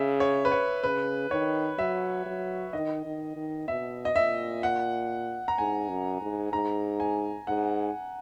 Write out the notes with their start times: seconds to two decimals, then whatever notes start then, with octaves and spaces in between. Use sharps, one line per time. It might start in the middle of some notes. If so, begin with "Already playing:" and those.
Already playing: C#3 E5
0.20 C#5
0.45 B4
0.52 C#5
0.84 C#3 B4
1.31 D#3 C#5
1.79 F#3 E5
2.26 F#3
2.73 D#3 D#5
3.05 D#3
3.36 D#3
3.68 B2 E5
4.05 D#5
4.16 A#2 E5
4.63 F#5
5.48 A#5
5.58 G#2 G#5
5.89 F#2
6.21 G#2
6.52 G#2 A#5
7.00 G#5
7.47 G#2 F#5